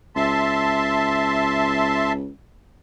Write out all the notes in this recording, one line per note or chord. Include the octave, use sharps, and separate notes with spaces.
C#2 E5 A5 C6